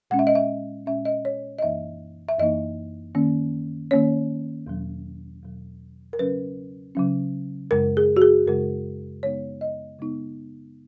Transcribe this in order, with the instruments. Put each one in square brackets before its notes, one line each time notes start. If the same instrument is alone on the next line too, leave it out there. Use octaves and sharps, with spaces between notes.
[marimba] A#2 G#3 C#4 F#5
E5
D#5
E5
A#2 G#3 C#4 E5
D#5
C#5
D#5
F#2 E3 A#3 D#4 E5
E5
F#2 E3 A#3 D#4 D#5
D#3 A#3 C#4
D#3 A#3 C#4 C#5
E2 B2 F#3
E2 B2 F#3
A#4
C#3 F#3 C#4 B4
C#3 F#3 C#4
F#2 C#3 G#3 A#4
G#4
F#4
G#4
F#2 C#3 G#3 A#4
C#3 G#3 B3 D#4 C#5
D#5
C#3 G#3 B3 D#4